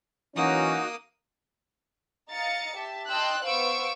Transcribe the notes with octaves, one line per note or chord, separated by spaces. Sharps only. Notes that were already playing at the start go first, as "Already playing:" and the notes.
E3 F#3 A#3 C#4 D#4 F#4 D#6
D#5 F5 A#5 A6 C#7
G4 E5 A5
D#5 G5 A5 C6 E6 F#6
B3 C5 F5 C#6 E6 D7